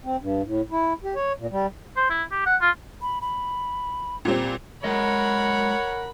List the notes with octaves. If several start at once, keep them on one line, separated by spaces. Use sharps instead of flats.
C4
G2
A2
E4
G4
C#5
A#2
G3
C5
E4
G4
F#5
F4
B5
B5
A#2 G3 C4
F#3 G#3 A#4 C#5 D#5 F#5 B5